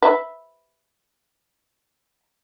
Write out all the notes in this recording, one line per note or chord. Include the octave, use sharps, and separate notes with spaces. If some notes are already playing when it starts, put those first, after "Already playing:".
B4 E5